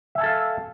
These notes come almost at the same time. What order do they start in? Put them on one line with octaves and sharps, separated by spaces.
E5 G#5 A5 A4 F5